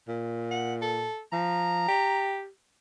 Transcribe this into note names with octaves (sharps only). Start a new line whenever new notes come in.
A#2
F#5
A4
F3 A#5
G4